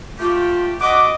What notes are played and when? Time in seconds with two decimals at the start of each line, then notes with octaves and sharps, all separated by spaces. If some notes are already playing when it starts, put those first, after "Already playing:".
0.19 A3 F4 G4
0.81 D4 F#4 B4 D#5 F#5 D6